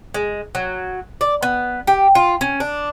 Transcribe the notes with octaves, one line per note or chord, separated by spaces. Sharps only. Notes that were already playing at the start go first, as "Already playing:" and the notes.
G#3
F#3
D5
B3
G4
F4
C#4
D4